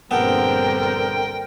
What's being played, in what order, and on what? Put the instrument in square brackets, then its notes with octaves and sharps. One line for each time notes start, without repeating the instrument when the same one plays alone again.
[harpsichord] A#1 B3 A4 [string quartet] G2 D3 C4 [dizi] A#4 [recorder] G5